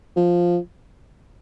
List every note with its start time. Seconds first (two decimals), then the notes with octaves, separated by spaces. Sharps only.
0.16 F3